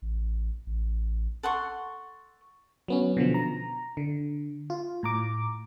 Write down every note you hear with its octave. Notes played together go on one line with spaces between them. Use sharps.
A1
A1
A4 F#5 C6 C#6
F#3 B3 C#4
B2 D3 F3
A#5
D3
F4
A2 A#5 D6